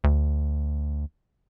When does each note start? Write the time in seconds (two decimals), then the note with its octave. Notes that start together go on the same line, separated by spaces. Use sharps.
0.04 D2